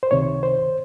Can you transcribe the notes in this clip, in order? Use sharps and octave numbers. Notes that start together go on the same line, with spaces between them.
C5
C#2 C3 D#3 C#5
C5